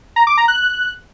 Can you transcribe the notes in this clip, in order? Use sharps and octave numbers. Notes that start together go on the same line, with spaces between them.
A#5
D6
A#5
F#6